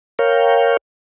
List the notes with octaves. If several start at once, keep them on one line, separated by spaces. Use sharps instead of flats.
A#4 C#5 F5 G5